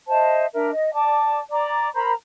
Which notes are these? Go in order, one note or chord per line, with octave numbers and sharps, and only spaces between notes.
C5 D#5 E5 A5
D4 A#4 E5
D#5
D5 A5 D6
D5 A#5 D6
A#4 C5 A#5 B5